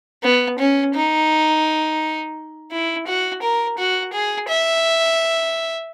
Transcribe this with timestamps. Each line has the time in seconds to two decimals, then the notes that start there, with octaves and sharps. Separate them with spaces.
0.23 B3
0.58 C#4
0.95 D#4
2.71 E4
3.07 F#4
3.42 A#4
3.78 F#4
4.13 G#4
4.48 E5